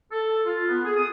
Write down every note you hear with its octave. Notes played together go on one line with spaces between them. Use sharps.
A4
F4
B3
G#4
D#6